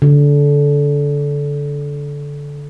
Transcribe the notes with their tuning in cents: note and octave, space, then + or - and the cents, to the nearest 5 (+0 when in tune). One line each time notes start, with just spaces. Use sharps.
D3 -20